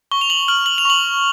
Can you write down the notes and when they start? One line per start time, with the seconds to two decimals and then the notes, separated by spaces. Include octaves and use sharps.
0.11 C#6 G7
0.21 F7
0.30 F#7
0.48 F6 F#7
0.66 F#7
0.78 F7
0.85 C#6 F#7